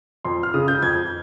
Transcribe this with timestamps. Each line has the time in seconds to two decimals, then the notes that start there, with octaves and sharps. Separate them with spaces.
0.25 F2 C6
0.43 F6
0.54 C#3 D#6
0.68 G6
0.82 F2 G#6